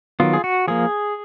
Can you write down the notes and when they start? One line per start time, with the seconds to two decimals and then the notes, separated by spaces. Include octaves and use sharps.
0.20 D#3 F#3 B3 F4
0.33 G#4
0.44 F#4
0.68 F3 A#3 G#4